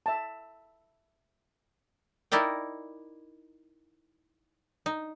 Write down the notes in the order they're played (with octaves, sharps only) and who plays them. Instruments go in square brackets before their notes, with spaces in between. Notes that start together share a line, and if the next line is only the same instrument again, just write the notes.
[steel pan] E5 A5
[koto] D#4 E4 A#4 D5 G5
D#4